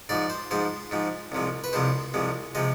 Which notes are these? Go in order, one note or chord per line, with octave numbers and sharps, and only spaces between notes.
G#2 F3 G#3 D5
C5
G#2 F3 G#3 C5
G#2 F3 G#3
C2 C3 F3 G#3
B4
C2 C3 F3 G#3 C5
C2 C3 F3 G#3
C3 F3 G#3 D#5